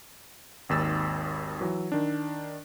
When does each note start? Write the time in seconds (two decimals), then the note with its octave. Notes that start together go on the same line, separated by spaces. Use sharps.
0.69 G#1 D#2 E6 A6
1.61 E3 F#3
1.92 D#3 D4